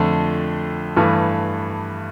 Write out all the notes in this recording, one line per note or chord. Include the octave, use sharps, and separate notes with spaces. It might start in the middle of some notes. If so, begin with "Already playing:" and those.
Already playing: F2 D3 A3
G2 E3 A3